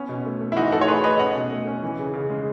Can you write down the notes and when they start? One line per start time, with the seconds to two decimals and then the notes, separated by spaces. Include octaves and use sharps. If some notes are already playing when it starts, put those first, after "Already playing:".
Already playing: B3 C#4
0.09 B2
0.25 A3
0.41 A3
0.52 E4
0.57 E3 D#4 F#4
0.72 A3 F#4 A4
0.81 C#5
0.88 A3 G#4 B4
1.04 A3 B4 D#5
1.19 C#4 D#5 F#5
1.35 B2
1.51 A3
1.67 C#4
1.83 E3
1.99 C#3
2.14 C#3
2.30 G#3